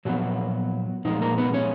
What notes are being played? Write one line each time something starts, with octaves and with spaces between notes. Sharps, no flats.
A#2 F3 F#3 B3 F#4
A#2 F3 G#3 D#4
A#3 A#4
B3 B4
C#4 C#5